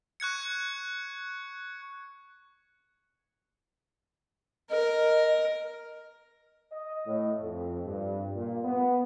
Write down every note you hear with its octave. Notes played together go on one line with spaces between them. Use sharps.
C#6 F#6 G#6 C#7
A#4 D#5
D#5
A2
F2
G2
A#2
B3